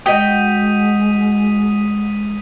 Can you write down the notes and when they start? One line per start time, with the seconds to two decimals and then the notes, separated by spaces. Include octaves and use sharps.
0.06 G#3 F#4 D#5 G5 D#6 B6 D#7